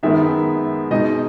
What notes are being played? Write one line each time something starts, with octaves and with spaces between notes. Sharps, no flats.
F#2 D#3 G#3 B3 D#4 E5
B2 G#3 D#4 D#5